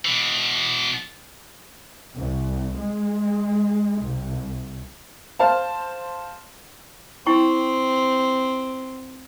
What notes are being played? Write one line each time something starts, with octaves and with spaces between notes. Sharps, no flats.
B2 E3
C2
G#3
C2
C5 F5 A5
C4 E4 G5 C#6